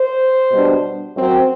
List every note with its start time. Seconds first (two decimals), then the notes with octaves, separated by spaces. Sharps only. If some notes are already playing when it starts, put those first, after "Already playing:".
Already playing: C5
0.52 B2 G3 D4
1.15 F#2 F#3 C4